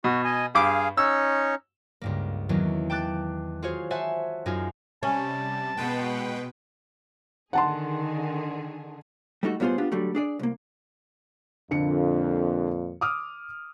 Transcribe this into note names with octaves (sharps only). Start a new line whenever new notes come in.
B2 F#4
D#5 G#5
G2 G#4 F5 D6
C#4 D#4 C#5 E6
C#2 G2 A#3
E2 D#3 F#3 A#3 C#4
G5 A5 D6 F#6 A6
F4 F#4 G#4 C5 C#5
C5 C#5 E5 F#5 G#5 A5
F#2 D#4 F4 G#4 G#5
C3 G3 C#4 A5
B2 G#3 B4 G5
D3 D#3 G#4 F#5 A5 C6
G3 A3 D#4 F#4
A2 G3 B3 F4 G#4 C5
B3 D4 F4 G4
D3 F#3 G3 A3
D4 G#4 D5
C2 A#3
F2 A#2 D3 C#7
D6 D#6 F6